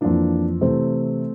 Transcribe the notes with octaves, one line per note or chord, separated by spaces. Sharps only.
F2 E3 A#3 D4
C3 E3 A3 C4